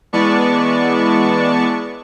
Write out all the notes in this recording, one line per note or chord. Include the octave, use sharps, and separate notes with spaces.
E3 G#3 B3 D5 A5 C#6